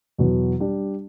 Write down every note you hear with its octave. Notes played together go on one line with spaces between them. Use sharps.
E2 B2 F#3 B3
G3 D4 G4